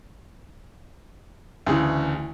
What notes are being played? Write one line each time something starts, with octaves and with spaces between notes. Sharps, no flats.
D2 C#3 E3